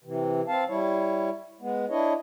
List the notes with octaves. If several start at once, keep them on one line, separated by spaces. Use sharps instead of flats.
C3 E3
C4 F5 A5
G3 E4 C#5
G#3 B3
D4 E4 C#5 D#5